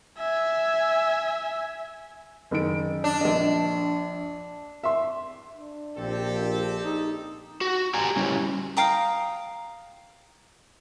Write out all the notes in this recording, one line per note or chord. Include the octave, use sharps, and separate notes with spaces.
E5 G#5
F#1 D#3 D7
D4
A#1 D#5
E5 C6
D4
A#1 C4 G4 A4
D#4
F#4
G4 G5 G#5 A#5
G3 C#4 E4
F5 G5 A#5 D#6